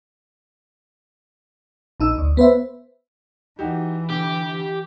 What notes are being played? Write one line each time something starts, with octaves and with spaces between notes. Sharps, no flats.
A#1 D#4 E6
D2
B3 B4 C5 E5
E3 D#4 F#4 G4
D3 G4